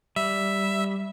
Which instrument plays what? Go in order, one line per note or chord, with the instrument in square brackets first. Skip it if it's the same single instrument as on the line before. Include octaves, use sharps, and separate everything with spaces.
[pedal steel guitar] G3 [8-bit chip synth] E5